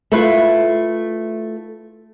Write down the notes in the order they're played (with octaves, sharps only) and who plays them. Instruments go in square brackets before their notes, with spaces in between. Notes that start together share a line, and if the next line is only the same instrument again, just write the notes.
[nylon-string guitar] A3 E4 F4 B4